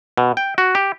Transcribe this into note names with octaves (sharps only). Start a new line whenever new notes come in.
B2
G5
F#4
G4